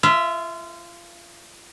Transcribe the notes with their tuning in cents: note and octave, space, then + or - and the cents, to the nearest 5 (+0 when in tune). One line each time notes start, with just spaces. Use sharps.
F4 -25 E5 +0